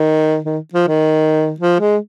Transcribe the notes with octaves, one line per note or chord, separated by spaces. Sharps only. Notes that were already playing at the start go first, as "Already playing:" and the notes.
Already playing: D#3
D#3
F3
D#3
F3
G#3